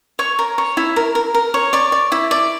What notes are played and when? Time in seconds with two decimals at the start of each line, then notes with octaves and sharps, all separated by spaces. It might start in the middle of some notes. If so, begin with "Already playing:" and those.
0.19 C#5 C#6
0.39 A#4
0.58 C#5
0.77 E4
0.96 A#4
1.15 A#4
1.34 A#4
1.54 C#5
1.73 D5 C#6
1.92 D5
2.12 E4
2.31 D5